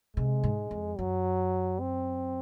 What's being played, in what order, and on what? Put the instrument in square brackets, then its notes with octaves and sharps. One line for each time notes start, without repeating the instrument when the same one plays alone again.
[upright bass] C3 [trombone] G#3
[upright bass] G#2
F2
[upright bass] F#2 [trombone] F#3
[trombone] C4